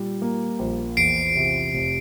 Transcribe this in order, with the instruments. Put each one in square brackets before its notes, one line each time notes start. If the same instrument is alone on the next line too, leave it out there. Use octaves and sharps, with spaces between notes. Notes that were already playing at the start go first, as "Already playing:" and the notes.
Already playing: [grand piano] A#2 G3
A#3
A#1
[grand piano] E2 [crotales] C7 D7
[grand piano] C3
F1